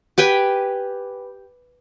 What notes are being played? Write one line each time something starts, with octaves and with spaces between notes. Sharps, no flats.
G4 B4 G5 G#5